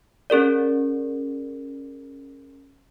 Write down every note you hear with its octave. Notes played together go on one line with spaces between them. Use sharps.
C#4 G#4 A#4 D5